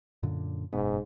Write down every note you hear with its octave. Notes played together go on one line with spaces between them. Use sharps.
F#2 A#2 D3
F#1 G#2 B2 B3